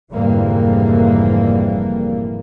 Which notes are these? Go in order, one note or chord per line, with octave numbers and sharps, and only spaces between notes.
F1 G#2 D3 E3 G3 A#3